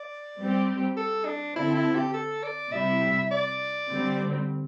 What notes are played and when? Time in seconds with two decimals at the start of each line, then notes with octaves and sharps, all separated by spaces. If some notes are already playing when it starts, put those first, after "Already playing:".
Already playing: D5
0.38 G3 C4 G4
0.97 A4
1.26 D4
1.55 D3 C4 E4 A4
1.75 E4
1.95 G4
2.14 A4
2.44 D5
2.72 C3 G3 E4 E5
3.31 D5
3.90 D3 G3 C4